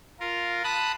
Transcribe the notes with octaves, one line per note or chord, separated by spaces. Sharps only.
F4 A#4
A5 B5 D#6 F#6